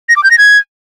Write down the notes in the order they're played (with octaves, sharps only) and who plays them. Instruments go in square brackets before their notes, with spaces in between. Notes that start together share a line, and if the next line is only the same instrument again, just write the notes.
[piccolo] A#6
D6
G6
A#6
G#6